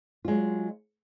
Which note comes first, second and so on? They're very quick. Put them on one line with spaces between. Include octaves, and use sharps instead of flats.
F4 G#3 F#3